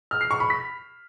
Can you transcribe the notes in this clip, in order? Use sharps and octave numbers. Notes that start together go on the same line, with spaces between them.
F6
C7
C#6
B5
B6